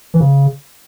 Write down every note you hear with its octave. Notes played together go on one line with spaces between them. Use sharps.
E3
C#3